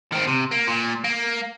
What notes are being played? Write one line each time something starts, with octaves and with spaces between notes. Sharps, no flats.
D#3 C4
C3
A#3
A#2
A#3